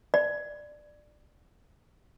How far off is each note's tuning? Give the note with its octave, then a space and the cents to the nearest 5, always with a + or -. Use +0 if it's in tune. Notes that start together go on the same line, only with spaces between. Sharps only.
D5 +15